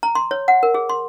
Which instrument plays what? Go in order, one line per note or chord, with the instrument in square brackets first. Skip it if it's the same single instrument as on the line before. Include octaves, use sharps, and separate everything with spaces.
[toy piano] A#5
C6
C#5
F#5
A#4
G#4
C6